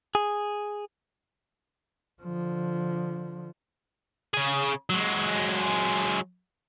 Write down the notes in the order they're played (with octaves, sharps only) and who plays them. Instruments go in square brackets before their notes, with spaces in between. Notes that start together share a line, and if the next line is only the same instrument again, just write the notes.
[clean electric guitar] G#4
[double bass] D3 F3
[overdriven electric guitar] C#3 G#4
F#3 G#3